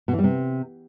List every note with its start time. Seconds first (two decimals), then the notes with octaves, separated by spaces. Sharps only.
0.08 B2
0.13 E3
0.19 G3
0.24 C3